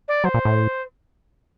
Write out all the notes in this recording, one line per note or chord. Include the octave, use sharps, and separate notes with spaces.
D5
F#3 C5
A#2
A2